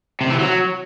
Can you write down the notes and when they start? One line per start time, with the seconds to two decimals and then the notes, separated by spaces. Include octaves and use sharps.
0.21 C3
0.30 E3
0.39 F#3